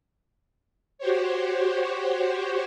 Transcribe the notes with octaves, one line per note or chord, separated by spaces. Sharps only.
F#4 G4 C5 C#5